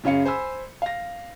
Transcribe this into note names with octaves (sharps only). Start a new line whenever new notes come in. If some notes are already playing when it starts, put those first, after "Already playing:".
F#2 C#3 C#4 F5 C#7
C5 G#5 B5 E6
F5 A#6